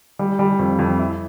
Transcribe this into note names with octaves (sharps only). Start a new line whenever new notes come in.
G3
G3
F2
F2
E4